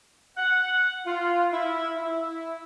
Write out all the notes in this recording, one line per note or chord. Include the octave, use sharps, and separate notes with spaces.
F#5
F4
E4
E4